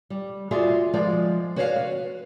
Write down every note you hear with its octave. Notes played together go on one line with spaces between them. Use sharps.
G3
F4 F#4 G#4 D5 E5
F3 G#3 D5
F#4 B4 C#5 D5 E5 F5
B4